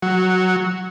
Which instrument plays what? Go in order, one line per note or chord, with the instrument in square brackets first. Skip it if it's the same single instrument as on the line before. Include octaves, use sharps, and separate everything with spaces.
[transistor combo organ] F#3